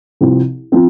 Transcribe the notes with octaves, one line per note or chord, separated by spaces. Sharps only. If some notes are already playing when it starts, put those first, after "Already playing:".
C2 C3 F3 C4
F3 C4